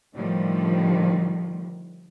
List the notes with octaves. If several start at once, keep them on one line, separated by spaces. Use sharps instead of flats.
A2 D3 D#3 F3 G3